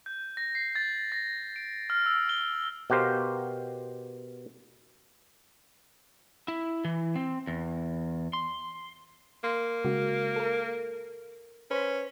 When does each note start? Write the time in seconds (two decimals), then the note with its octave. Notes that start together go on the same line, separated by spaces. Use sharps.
0.06 G6
0.37 A#6
0.55 C7
0.76 A6
1.12 A#6
1.56 D7
1.90 F6
2.06 E6
2.29 G7
2.90 B2 F#4 G4 A#4 C5 F5
6.48 E4
6.85 E3
7.15 C4
7.47 E2
8.33 C6
9.44 A#3 C6
9.85 C#3 G#3 F#4
10.36 A4 A#4
11.71 C#4 B4 C5 B6